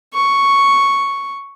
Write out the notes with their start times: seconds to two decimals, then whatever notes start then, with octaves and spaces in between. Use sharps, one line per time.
0.14 C#6